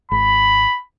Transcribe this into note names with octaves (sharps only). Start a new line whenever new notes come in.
G#1 B5